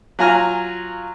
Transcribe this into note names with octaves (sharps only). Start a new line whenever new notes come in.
F#3 F4 G#5 A#5 F6